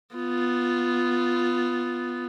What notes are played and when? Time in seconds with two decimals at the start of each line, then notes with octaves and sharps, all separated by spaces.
0.15 B3 F4